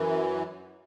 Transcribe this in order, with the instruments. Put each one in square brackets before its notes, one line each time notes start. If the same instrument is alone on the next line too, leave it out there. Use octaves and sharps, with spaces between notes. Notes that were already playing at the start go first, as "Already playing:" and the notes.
Already playing: [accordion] F#2 E3